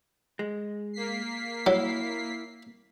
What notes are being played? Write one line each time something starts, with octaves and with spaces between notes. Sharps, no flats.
G#3
A#3 B6 C7
F#3 E4